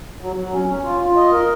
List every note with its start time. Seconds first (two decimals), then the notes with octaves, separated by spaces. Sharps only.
0.21 F#3
0.36 F#3
0.52 C#4
0.68 C#4
0.84 F4
1.01 F4
1.16 D#5
1.32 A#4